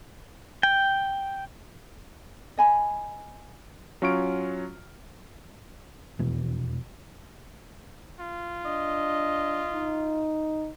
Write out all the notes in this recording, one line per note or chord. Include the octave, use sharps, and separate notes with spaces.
G5
D#5 G#5 B5
F#3 C#4 F4 C#6 F6 D7
F1 E2 B2 E3
F4
D4 D#5
D#4